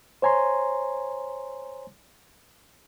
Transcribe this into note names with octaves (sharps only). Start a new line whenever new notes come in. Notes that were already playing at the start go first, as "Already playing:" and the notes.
C5 C#5 G#5 A#5 C6